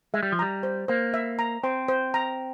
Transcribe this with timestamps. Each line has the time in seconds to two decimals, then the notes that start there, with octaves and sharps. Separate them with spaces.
0.14 G#3 E5
0.23 G3
0.32 F3
0.39 G3 A#5
0.63 C5
0.88 A#3 C5
1.14 E5
1.39 A#5
1.63 C4 C5
1.88 C5
2.14 A#5